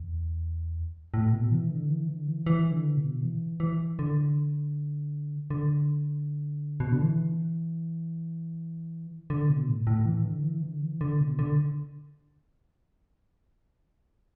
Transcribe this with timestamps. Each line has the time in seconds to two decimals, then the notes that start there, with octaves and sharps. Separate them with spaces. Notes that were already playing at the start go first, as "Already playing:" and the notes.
Already playing: E2
1.14 A2
1.33 B2
1.51 E3
1.71 D3
1.89 E3
2.08 D3
2.27 E3
2.46 E3
2.72 D3
2.97 B2
3.22 E3
3.60 E3
3.99 D3
5.50 D3
6.80 B2
6.92 D3
7.02 E3
9.30 D3
9.49 B2
9.68 A2
9.87 A2
10.06 E3
10.25 D3
10.43 E3
10.62 D3
10.82 E3
11.01 D3
11.20 B2
11.39 D3